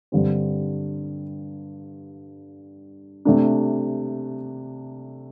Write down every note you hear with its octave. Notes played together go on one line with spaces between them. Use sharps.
G2 D3 G3 C4
C3 A3 D4